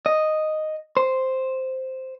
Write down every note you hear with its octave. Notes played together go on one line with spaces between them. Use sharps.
D#5
C5